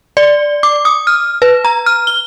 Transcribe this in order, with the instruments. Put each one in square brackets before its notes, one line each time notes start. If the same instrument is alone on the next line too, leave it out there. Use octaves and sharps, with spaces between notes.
[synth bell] D5
D6
D#6
F6
B4
A#5
F6
G7